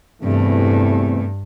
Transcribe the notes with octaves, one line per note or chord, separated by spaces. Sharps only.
E2 G2 C3 E3 A3